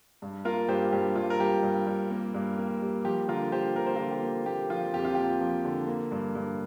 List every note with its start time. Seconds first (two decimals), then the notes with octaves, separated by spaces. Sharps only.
0.22 G2
0.45 A#3 F4 A#4
0.68 G2 G4 C5
0.92 G2 G4
1.16 G2 F4
1.30 A#4
1.39 G3 G4
1.63 G2
1.87 G3
2.11 A#3
2.34 G2
2.58 A#3
2.82 G3
3.04 F3 G4
3.28 D3 F4 A#4
3.52 D3 G4 C5
3.75 A#3 A#4
3.86 C5
3.96 F4 A#4
3.99 D3
4.11 G4
4.23 A#3
4.46 A#3 G4
4.70 F3 F4
4.93 F2 G4
5.05 F4
5.15 A#3 G4
5.41 F3
5.65 D3
5.87 A#3
6.11 G2
6.35 G2